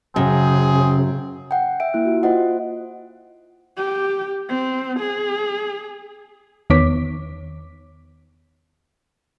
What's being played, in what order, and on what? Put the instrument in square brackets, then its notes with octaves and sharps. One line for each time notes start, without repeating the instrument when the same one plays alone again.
[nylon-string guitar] F#2 [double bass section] C#3 [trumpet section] C4 G#4
[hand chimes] F#5 G5
E5 G5 D7
A#3 E4 F#6
F4 F#4
F4 C5 D#5 F#5
[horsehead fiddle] G4
C4
G#4
[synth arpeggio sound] E2 D#3 B3 C#5 D6 B6